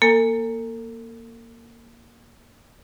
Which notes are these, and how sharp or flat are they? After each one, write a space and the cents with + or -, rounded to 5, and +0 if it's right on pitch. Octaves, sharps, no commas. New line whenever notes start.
A#3 +5 A4 +45 G#5 +0